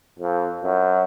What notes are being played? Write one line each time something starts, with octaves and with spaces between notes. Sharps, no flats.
F2
F#2